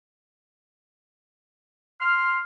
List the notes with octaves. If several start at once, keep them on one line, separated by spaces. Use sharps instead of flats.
C6 F6